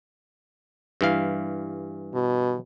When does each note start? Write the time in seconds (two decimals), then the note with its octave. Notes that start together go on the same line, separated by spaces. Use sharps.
1.01 G2 E3 F5
2.15 B2